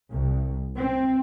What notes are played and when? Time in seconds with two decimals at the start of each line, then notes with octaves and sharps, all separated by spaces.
0.11 C2
0.78 C4